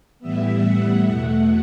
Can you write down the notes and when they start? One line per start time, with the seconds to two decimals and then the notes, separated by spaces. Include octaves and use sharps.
0.19 A2 E3 G3 B3 E5
0.63 F#5
1.07 E2 B2 A3